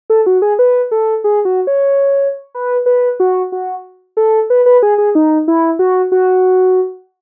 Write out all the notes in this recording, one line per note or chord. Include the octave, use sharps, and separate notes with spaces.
A4
F#4
G#4
B4
A4
G#4
F#4
C#5
B4
B4
F#4
F#4
A4
B4
B4
G#4
G#4
D#4
E4
F#4
F#4